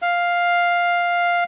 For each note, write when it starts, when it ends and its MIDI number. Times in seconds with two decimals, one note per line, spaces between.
0.02 1.44 77